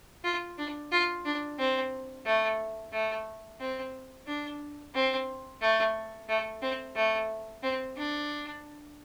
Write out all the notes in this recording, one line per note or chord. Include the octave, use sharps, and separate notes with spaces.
F4
D4
F4
D4
C4
A3
A3
C4
D4
C4
A3
A3
C4
A3
C4
D4